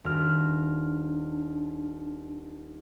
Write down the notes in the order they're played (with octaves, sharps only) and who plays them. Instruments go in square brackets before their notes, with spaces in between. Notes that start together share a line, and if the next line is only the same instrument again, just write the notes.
[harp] D#1 F#4 F6 [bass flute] D4